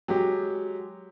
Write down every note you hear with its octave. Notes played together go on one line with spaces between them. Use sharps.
F#3 G#3 G4